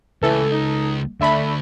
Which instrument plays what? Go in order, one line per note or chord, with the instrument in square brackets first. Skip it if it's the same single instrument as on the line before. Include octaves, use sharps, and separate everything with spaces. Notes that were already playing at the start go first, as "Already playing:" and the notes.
[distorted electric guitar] C#2 [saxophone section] A2 E3 [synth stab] A4
[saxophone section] D#4
[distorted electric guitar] D2 [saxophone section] A3 D4 [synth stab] E5 B5